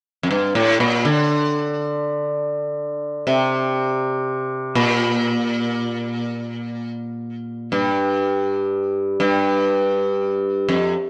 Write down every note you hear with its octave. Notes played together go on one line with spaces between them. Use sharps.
F2
G2
A2
A#2
D3
C3
A#2
G2
G2
F2